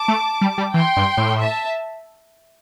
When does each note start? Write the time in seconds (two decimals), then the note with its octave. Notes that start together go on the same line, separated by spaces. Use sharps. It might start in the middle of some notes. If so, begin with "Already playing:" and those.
Already playing: A5 D6
0.08 A3
0.41 G3
0.58 G3
0.74 E3 G5 C6
0.97 G2
1.17 A2
1.40 E5 A5